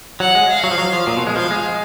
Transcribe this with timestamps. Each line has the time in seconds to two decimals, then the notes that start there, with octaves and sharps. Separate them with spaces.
0.20 F#3 F#5
0.35 G#3
0.49 F5
0.64 F#3
0.71 F3
0.78 F#3
0.93 F3
1.07 A#2
1.17 B2
1.27 G#3
1.36 F3 F5
1.51 G#3